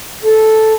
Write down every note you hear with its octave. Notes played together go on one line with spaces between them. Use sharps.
A4